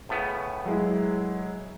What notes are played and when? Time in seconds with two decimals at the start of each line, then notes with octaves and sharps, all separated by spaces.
0.09 A2 C#3 B3
0.65 F#3 G#3 E4